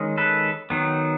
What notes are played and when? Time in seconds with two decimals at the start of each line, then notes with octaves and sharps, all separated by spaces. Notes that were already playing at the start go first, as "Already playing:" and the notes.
Already playing: D#3 G#3 C#4
0.18 A4 B4
0.70 D#3 F#3 B3